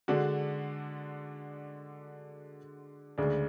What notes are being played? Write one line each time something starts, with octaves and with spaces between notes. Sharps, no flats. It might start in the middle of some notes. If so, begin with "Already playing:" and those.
D3 G#3 D4 F#4
D2 C#3 G#3 D4